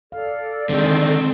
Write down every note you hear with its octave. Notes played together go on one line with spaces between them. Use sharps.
A4 D5 F5
D3 D#3 G#3 C4 G#4